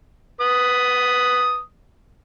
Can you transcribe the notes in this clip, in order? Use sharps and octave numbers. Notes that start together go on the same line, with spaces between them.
B4 D#6